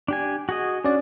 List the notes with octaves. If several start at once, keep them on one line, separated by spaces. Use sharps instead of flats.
D4 G4 G#5
F#4 G#4 D#5
C#4 D4 F#4 D5